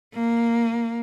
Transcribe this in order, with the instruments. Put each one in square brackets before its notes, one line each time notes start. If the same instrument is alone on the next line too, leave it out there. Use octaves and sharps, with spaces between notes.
[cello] A#3